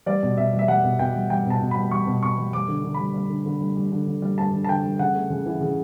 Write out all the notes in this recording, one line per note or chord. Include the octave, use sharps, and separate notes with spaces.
G3 D5
B2
B2 E5
G3
E5
G3 F#5
B2
B2 G5
G3
G3 G5
B2 A5
B2
G3 B5
G3 C#6
B2
B2 C#6
G3
G3 D6
D3
D3
G3 B5
G3
D3
D3
G3
G3
D3
D3
G3
G3 A5
D3
A5
D3 G5
G3
C#3 F#5
A3
C#3
E3
C#3